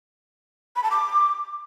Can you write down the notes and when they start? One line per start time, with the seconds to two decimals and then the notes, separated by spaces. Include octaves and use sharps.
0.76 B5
0.83 A5
0.91 D6